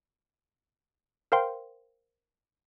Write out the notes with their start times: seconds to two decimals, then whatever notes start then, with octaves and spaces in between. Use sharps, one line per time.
1.32 A#4 C5 F5 G5 C6